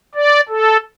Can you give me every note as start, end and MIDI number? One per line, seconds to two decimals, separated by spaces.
0.15 0.41 74
0.49 0.77 69